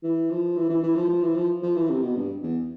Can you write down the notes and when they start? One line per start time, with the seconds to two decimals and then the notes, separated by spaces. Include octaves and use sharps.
0.03 E3
0.30 F3
0.57 E3
0.69 E3
0.83 E3
0.96 F3
1.09 F3
1.22 E3
1.36 F3
1.62 F3
1.76 E3
1.90 C3
2.03 B2
2.16 G2
2.43 E2